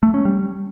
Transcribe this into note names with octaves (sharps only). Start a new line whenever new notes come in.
A3
C#4
G3